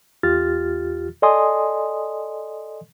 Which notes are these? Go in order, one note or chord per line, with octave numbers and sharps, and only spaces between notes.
E2 F4 G4 F6 A6
A4 D5 D#5 G#5 C6 D#6